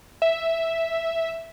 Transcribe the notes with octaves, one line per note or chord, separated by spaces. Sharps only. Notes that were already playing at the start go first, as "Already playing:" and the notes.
E5